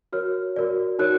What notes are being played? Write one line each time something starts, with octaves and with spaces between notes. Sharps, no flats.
F#4 A#4 C#5 F6
F#4 A#4 D5
D#4 F#4 A#4 C#5 F#6